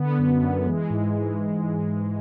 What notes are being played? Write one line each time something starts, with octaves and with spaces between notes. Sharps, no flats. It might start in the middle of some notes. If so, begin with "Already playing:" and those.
Already playing: D3 B3
F#2
F#2
E3 G#3
G#2
E3